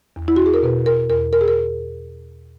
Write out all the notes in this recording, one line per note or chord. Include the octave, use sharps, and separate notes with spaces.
E2
E4
F#4
G#4
A#4
B2 B4
A#4
E2 A#4
A#4
G#4
A#4